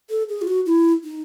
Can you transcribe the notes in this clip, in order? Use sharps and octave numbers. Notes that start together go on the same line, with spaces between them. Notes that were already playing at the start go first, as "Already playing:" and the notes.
A4
G#4
F4
F#4
E4
D#4